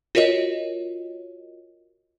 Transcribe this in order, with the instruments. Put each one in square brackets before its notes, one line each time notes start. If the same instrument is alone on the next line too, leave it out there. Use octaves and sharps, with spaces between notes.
[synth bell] F4 F#4 A#4 C#5 D#5